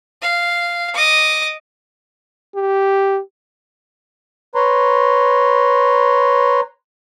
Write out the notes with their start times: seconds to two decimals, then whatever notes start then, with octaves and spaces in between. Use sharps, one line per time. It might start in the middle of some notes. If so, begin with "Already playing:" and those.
0.21 F5
0.94 D#5 D6
2.56 G4
4.55 B4 C#5 A#5 C6